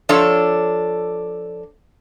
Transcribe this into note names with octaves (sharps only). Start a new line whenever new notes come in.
F3 D4 A4 C#5